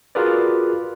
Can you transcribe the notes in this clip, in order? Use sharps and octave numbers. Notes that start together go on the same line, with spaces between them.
F4 F#4 G#4 A#4 B4 D5